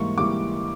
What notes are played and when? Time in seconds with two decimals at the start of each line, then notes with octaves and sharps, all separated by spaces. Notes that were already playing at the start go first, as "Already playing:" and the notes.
Already playing: G#2 E3 G3 A#3 C#6
0.18 E3 G3 A#3 D6